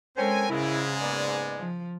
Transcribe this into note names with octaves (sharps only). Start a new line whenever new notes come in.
G#3 C4 C#4 A4 A#4 C5 G5 G#5
G#2 C#3 G#3 E4
A#3 B3 D5
F3